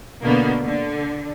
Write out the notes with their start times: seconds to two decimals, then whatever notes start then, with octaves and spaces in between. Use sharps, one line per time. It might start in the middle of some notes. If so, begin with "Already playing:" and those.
0.21 B2 D3 A#3 B3
0.62 D3